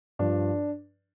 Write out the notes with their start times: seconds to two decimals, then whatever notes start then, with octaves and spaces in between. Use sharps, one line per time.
0.19 G2 F3 D4